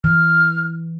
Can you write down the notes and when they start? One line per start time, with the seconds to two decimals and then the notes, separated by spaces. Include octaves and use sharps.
0.04 E3 F6